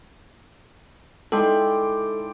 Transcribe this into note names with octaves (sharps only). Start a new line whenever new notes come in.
G#3 D#4 E4 A4 D5 G5 C6